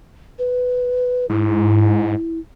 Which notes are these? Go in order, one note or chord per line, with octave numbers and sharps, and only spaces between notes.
B4
G#2 E4